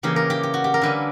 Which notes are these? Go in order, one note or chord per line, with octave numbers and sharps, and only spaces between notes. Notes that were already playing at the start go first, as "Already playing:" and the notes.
C#3 E3 A#3 G4
A#4
G4
G4
F#4
G4
A#4
D3 G3 A#3 C#4 B4